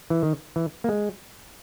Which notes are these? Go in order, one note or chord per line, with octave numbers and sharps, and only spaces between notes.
E3
D#3
E3
A#3
G#3